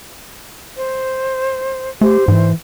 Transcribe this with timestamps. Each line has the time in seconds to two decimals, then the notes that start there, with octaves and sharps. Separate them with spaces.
0.77 C5
2.01 A3 G4 C5
2.28 G#2 E3